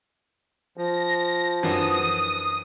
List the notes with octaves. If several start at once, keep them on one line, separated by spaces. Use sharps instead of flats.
F3 A#6
F#2 E3 D4 D#6